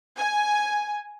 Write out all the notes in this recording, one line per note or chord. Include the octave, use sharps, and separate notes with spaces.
G#5